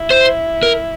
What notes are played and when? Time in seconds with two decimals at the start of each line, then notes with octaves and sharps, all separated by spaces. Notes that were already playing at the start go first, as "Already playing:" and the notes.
Already playing: E4
0.10 C5
0.63 A#4